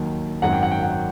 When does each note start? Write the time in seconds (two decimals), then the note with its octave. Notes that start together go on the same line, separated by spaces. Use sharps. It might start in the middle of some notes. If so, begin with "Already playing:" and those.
Already playing: D#2 D#3 F#3
0.42 G#1 F#2 D#3 F#3 F#5
0.53 G5
0.63 F#5
0.71 G5
0.82 F#5
0.92 G5